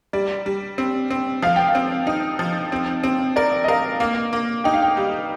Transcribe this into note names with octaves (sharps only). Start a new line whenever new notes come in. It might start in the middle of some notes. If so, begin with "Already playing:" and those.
G3 D5
G3
C4
C4
F3 F5
G5
F5
C4
D#4
F3
C4
C4
A#4 D5
D#5
A#4 F5
A#3
A#3
D#4 G5
F5
G5
G3